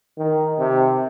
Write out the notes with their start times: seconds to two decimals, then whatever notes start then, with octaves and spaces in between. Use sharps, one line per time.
0.18 D#3
0.59 C3